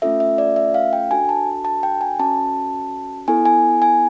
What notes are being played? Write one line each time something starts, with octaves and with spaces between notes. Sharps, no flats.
A3 C#4 F4 A4 E5
E5
D5
E5
F5
G5
D4 F#4 A4 G#5
A5
A5
G5
G#5
C#4 F#4 A4 A5
B3 E4 A4 G#5
G#5
G#5